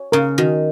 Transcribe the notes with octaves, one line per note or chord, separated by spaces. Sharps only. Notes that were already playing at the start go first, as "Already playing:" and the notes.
Already playing: C#5
C#3 A#4
D#3 F#4